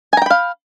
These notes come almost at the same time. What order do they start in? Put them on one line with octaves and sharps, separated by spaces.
G#5 A#5 G5 B5 F5